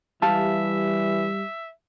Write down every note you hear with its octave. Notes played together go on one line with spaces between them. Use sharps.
E3 G3 G4 E5 F5 A5